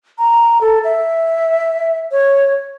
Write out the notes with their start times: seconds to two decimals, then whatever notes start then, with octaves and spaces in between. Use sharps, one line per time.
0.18 A#5
0.61 A4
0.84 E5
2.11 C#5